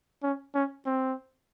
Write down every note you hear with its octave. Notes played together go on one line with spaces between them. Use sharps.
C#4
C#4
C4